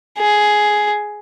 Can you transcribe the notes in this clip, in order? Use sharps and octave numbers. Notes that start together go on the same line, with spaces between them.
G#4